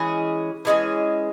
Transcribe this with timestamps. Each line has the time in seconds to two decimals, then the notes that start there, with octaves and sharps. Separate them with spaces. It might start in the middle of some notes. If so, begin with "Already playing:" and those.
Already playing: E3 G#3 C#4 G#4
0.65 E3 G#3 C#4 G#4